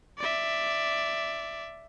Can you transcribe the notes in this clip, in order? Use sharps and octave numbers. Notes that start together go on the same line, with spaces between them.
D5 E5